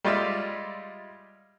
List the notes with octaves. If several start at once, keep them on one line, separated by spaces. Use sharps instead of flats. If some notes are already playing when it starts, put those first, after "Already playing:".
G3 G#3 F4 D5 E5